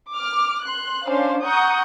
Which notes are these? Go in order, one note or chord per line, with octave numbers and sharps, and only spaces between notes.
D6 F6
C6 F#6
C#4 D4 C5 F5
F#5 A#5 C#6 D#6 G6